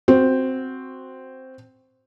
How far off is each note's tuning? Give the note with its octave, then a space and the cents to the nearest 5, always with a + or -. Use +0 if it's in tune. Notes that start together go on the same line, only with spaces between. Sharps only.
C4 +0 F#4 +0